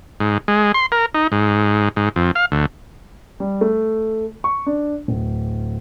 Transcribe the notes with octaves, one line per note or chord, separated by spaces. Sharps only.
G#2
G#3
C6
A#4
D#4
G#2
G#2
F2
F5
D2
G3
A3
C#6
D4
D1